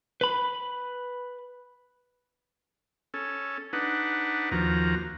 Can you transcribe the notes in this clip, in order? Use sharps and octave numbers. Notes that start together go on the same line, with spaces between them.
B4 B5
C#4 A4
D4 D#4 B4 F#5
D#2 F3 F#4 A#5